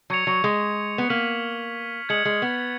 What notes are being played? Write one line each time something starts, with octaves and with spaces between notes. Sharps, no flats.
F#3 C#6 G#6 C#7 F7
F#3
G#3
B3
A#3 F6 B6 D#7 F#7
G#3 G#6 C#7 F#7
G#3
B3